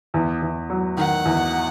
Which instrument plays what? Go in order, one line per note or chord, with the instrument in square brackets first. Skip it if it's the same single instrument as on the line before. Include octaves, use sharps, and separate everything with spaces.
[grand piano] E2
E2
F#3
[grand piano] D#3 [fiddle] F#5
[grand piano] E2